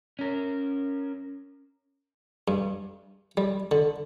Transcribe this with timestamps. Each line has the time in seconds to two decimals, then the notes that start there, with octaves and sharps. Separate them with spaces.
0.19 C#4 A#4
2.48 G2
3.37 G3
3.71 D3